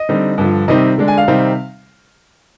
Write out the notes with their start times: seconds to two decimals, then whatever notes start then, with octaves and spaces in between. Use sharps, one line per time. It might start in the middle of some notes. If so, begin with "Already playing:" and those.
Already playing: D#5
0.09 D3 G3 C4 D#4
0.38 G2 D3 F3
0.68 C3 D#3 G3 C4 D#4 D#5
0.98 D3 G#3 D4
1.08 G#5
1.18 F5
1.27 C3 D#3 G3 C4 D#4